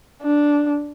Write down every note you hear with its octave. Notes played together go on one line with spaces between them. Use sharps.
D4